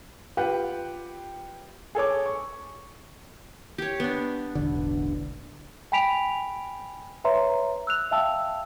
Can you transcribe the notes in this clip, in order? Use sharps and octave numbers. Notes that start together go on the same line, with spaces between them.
F4 G4 B4 F#5
G#4 A4 C#5 D6
C#6
G4 C#5
B3 D4
E1 A1 D3
G5 G#5 B5 B6 D7 F7
B4 C#5 E5 A#5 C6
E6 F#6 F7
E5 F5 G5 A5 E6